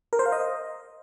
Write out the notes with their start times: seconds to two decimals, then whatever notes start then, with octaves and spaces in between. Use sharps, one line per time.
0.13 A#4
0.19 C5
0.26 F5
0.32 D#5